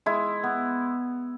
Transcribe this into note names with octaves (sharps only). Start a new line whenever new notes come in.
G#3 E4
B3